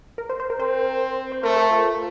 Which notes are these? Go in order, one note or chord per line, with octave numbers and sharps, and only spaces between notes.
A#4
C5
C5
A#4
C4 C5
C5
A3 A#4
A4
F4